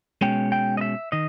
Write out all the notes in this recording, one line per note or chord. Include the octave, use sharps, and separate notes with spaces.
B2 G#3 C#4 G5
G5
D#5
E5
D#3 D#5